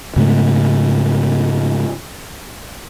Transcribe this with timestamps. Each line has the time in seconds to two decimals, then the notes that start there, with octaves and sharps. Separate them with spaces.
0.16 G#2 C#3 A3